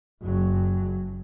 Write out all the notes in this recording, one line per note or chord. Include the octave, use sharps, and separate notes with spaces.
F#1 F#3